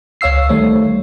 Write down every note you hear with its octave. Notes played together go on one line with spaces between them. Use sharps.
C#2 C#5 F5 E6 C7
D#3 G3 A3 C5 C#5